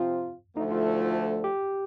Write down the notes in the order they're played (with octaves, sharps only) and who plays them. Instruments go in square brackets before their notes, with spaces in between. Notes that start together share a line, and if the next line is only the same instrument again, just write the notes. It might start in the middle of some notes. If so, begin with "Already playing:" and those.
Already playing: [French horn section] C3 F3 C4 F4
[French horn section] D2 D3 F3 A3 [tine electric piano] D#4
[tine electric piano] F4
G4